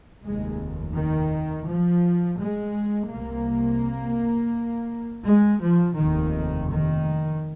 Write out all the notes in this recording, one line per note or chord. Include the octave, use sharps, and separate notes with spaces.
F1 D#2 G#3
D#3
F3
G#3
C2 C3 A#3
G#3
F3
F1 D#2 D#3
D#3